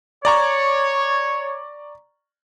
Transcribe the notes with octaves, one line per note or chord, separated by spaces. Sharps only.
C#5 D5 A#5 C#6